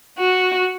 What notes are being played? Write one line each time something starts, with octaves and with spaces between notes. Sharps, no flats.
F#4